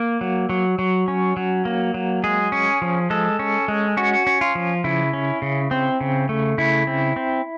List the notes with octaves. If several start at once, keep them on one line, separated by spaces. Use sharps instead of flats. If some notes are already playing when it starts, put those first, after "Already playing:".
Already playing: A#3
F#3
F#3
F#3
C#4
F#3
A#3
F#3
G#3 G#4
C#4
F3
G#3 A4
C#4
G#3
C#4 F#4
C#4
F4
F3
C#3 E4
C#4
C#3
C4
C#3
A3
C#3 E4
C4
C4